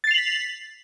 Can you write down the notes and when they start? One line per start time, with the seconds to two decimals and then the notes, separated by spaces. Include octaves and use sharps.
0.04 A6
0.07 C7
0.11 F7
0.14 F#7
0.18 B6